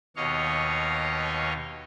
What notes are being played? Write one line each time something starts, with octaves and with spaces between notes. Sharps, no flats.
D#2 B2 C#5 D#5 F5 C#6